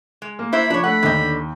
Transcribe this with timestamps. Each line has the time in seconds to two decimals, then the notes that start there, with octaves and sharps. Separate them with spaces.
0.22 G#3
0.39 A#3
0.53 E4 C5 E5 B5
0.70 F3 D4 C#5
0.84 A3 F#5 B5
1.03 D#2 D3 D#5 G6